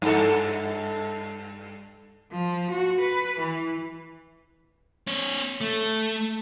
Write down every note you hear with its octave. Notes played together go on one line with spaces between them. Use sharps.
G2 A4
F3
F#4
B4
E3
C4 C#5
A3